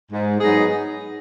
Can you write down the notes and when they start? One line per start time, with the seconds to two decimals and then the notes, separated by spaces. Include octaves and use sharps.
0.11 G#2
0.40 F#3 B3 D#4 G#4